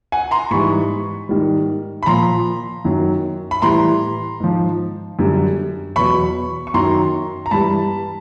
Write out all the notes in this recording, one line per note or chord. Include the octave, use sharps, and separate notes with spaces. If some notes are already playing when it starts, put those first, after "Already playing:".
F#5 G#5
A#5 C6
G#2 E3 G3 B5 C#6
G#2 D#3 G3
B5
A#2 F3 A#5 C6
F#2 D#3 F#3
B5
A2 E3 G3 A#5 C6
G#2 F3
F#2 D3 G3
E2 B2 F#3 B5 C#6
C#6
F#2 D#3 F#3 A#5 C6
A#5
G2 E3 G3 A5 B5